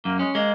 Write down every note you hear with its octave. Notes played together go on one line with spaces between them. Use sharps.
F#2 A#3
G#3 C#4
G#3 A#3